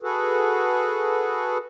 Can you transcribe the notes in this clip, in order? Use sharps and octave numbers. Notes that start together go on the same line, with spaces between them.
F#4 G#4 A4 B4